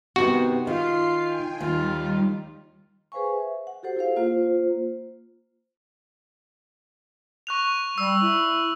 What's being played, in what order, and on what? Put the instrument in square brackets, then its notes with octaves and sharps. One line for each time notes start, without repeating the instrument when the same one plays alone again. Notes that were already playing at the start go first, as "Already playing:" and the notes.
[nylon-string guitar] C3 D#3 B3 [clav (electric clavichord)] F#4
[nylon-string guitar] D#3 [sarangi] F4 [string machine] C7
[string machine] G5 G#5
[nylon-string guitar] D#2 [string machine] D#3 G3 [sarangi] F4
[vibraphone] G#4 B4 C5 F5 G#5 C#6
E5
F#5
F#4 G4 A4 C5
E4 G#4 C5 F5
A#3 F4 C5
[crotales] C#6 F#6 F7
[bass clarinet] G3 [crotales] E6
[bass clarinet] E4